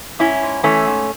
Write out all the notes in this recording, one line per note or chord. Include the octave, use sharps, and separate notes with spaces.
G#2 C#4 E4
G#2
E3 A3 C#4
G#2